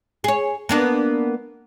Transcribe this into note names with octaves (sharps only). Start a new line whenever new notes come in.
G#4 C#5
A#3 B3 D4